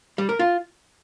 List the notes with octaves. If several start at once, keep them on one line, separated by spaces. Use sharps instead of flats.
G3
A#4
F4